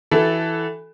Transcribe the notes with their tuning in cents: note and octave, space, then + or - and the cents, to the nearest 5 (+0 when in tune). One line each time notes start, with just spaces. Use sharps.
E3 +0 F#4 +30 A4 -5